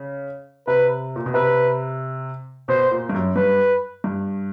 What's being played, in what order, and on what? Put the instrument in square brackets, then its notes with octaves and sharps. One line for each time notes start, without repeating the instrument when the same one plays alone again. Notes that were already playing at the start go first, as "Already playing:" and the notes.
Already playing: [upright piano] C#3
[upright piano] C3 [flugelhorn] B4
[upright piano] A#2
B2
[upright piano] C3 [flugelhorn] B4
[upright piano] B2 [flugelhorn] C5
[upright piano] A#2
G2
F#2
[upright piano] G2 [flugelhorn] B4
[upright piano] G2